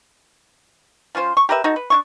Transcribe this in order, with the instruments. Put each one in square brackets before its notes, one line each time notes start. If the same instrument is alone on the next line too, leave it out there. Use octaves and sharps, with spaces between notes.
[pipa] F3 C#4 F4 C5
C#6
G4 A#4 B4 E5
D#4 F#4 A4
B4
D4 E4 C#6